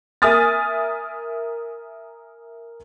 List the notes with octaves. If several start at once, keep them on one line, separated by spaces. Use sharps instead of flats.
A#4 E5 G#5 D#6 F6 A6